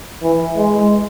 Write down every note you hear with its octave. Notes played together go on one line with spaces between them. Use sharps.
E3
G#3